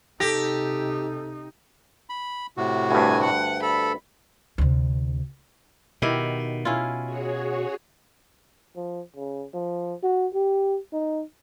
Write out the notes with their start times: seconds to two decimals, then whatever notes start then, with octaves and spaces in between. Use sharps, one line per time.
0.20 C3 D#4 G4 A4 A#6
2.09 B5
2.57 A2 C3 F#4
2.91 D2 G2 G#5
3.23 F#5
3.62 A4 B5
4.58 D2 C3
6.02 B2 D#3 E4 G4
6.65 C#4 E4 F4
7.05 F#4 G#4 C#5
8.76 F3
9.16 C#3
9.54 F3
10.03 F#4
10.34 G4
10.93 D#4